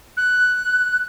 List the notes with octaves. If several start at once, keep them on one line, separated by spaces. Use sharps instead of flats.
F#6